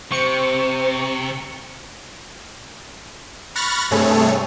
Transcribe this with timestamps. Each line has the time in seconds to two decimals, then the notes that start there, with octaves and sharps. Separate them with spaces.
0.12 C3 C5 C#6 C#7
3.55 B5 C#6 F6 F#6 A6 A#6
3.91 G2 C3 A3 G#4 A4 C#5